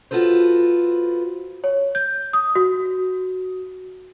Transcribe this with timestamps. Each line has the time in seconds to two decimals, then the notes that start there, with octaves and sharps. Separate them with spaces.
0.11 F4 F#4 A4 B4 C5
1.64 C#5
1.95 G6
2.33 D#6
2.55 F#4